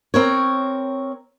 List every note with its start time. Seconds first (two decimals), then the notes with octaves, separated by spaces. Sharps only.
0.14 C4 A#4 C#5